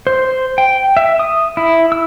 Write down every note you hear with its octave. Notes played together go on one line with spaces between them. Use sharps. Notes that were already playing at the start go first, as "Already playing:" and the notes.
C5
G5
E5
D#6
E4
E6